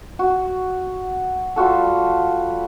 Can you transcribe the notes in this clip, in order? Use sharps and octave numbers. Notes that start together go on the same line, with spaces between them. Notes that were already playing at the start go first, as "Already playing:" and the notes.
F#4
G3 F4 F#4 A4